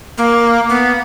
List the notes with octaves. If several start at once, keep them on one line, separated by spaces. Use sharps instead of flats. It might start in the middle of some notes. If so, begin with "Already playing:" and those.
A#3
B3